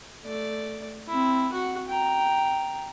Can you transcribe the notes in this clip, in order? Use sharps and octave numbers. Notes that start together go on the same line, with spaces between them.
A3 D5
C4 E4
F#4 F#5
G5 A#5